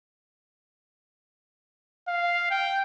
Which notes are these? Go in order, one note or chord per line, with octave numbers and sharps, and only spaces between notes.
F5
G5